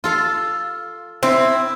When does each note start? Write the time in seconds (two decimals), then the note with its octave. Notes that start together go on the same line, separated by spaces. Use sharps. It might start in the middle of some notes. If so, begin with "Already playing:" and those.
0.04 F4 A4 F5
1.23 C4 E4